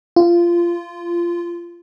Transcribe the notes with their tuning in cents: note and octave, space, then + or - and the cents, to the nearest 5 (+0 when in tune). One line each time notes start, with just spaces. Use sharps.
F4 -20